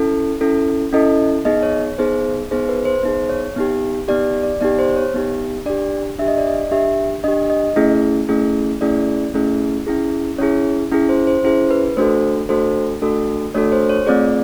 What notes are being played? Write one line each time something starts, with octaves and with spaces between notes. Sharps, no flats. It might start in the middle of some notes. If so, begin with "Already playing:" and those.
Already playing: C#4 E4 A4
C#4 E4 A4
C#4 E4 A4 D#5
B3 D#4 G#4 D#5
C#5
B3 D#4 G#4 C5
B3 D#4 G#4 C5
B4
C5
B3 D#4 G#4 C5
C#5
B3 D#4 G4
B3 D#4 G4 D5
D5
B3 D#4 G4 D5
C5
C#5
B3 D#4 G4
D4 G4 D5
D4 G4 E5
D#5
D5
D#5
D4 G4 E5
D4 G4 D#5
D#5
A3 C#4 E4 G#4
A3 C#4 E4 G#4
A3 C#4 E4 G#4 D5
A3 C#4 E4 G#4
C#4 E4 G#4
C#4 E4 G#4 C#5
C#4 E4 G#4
C5
C5
C#4 E4 G#4 C5
B4
A3 D4 F#4 A4 C5
A3 D4 F#4 A4 C5
A3 D4 F#4 A4
A3 D4 F#4 A4 C#5
C5
C#5
A3 C4 F4 G#4 D5